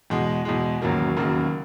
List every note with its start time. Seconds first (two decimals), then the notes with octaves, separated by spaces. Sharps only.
0.10 E2 B2 G#3
0.45 E2 B2 G#3
0.82 E1 D#2 C#3 F#3 A#3
1.17 E1 D#2 C#3 F#3 A#3